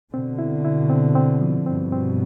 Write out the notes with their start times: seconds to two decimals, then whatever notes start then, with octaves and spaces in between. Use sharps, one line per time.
0.13 B2 D3 C4
0.39 E4
0.65 E4
0.90 C4
1.15 C4
1.41 F3
1.66 G2 B2 C4
1.92 C4